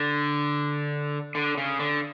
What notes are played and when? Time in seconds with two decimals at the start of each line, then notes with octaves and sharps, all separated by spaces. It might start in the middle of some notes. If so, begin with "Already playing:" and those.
Already playing: D3
1.35 D3
1.58 C#3
1.79 D3